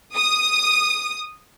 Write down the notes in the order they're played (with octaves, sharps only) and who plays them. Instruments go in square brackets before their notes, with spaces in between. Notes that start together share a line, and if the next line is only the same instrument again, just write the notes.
[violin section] D#6